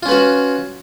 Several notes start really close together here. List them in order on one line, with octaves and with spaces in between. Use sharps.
F4 C#4 B4 F#4